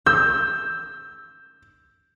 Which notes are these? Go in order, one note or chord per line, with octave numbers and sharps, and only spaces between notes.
E6 G6